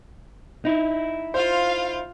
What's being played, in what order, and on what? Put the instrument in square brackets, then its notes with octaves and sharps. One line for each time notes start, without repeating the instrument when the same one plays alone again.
[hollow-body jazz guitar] D#4 E4
[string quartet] F4 F5 [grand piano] C5